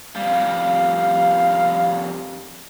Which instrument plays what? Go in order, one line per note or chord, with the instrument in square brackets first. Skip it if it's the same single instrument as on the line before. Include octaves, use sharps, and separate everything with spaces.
[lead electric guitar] F2 G3 [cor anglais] F5